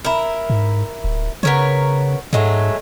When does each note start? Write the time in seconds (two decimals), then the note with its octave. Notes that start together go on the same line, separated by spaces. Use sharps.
0.05 E4 A#4
0.50 G#2
1.04 D1
1.43 C#3 B3 A#4 C#5
2.33 G#2 F#3 G#3 A3